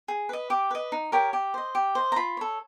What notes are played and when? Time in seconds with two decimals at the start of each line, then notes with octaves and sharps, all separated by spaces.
0.08 G#4
0.29 B4 D#5
0.50 G4 D6
0.71 B4 D#5
0.92 D#4
1.12 G4 A#4 C#5
1.33 G4
1.54 C5 D#5
1.75 G4
1.95 C5 D#5
2.12 A#5
2.16 F4 B5
2.37 A4 C#5